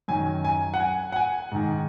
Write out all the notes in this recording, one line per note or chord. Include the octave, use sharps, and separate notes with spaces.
F#2 D#3 G#5
G#5
F#5
G#5
F#5
G#5
G#2 D#3